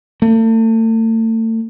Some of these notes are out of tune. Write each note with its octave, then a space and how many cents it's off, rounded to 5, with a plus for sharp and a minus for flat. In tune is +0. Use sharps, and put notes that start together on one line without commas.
A3 +35